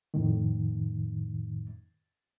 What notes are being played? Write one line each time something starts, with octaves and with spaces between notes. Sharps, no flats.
F2 A2 D#3